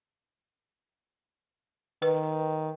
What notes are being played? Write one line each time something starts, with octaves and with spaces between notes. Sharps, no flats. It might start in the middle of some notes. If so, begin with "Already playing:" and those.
D#3 B4